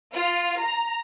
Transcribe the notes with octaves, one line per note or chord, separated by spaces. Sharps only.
F4
A#5